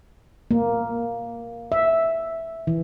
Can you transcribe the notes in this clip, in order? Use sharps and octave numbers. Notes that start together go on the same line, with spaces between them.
A#3
E5
E3